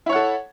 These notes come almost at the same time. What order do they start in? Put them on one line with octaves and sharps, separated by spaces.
E4 C#5 F#5 A4